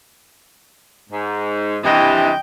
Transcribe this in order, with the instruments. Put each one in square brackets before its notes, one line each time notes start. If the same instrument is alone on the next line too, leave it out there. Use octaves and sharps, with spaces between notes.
[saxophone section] G#2
[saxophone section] G2 C3 E3 [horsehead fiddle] D#5 G5